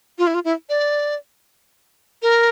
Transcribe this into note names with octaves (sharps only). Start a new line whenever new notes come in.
F4
E4
F4
E4
D5
A#4